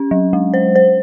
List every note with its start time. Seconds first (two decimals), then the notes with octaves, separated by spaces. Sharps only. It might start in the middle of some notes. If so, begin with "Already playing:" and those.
Already playing: C#4
0.11 F#3
0.33 G#3
0.54 C5
0.75 C5